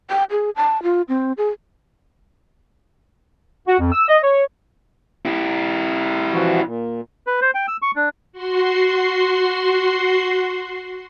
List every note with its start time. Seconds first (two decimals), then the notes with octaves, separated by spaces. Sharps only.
0.10 G5
0.31 G#4
0.56 A5
0.83 F4
1.09 C4
1.38 G#4
3.68 F#4
3.80 F2
3.92 E6
4.09 D#5
4.23 C#5
5.25 E4 G4
6.32 E3 F3 F#4
6.66 A#2
7.27 B4
7.42 C5
7.55 G5
7.68 E6
7.82 C#6
7.96 D4
8.32 F#4 C6 C7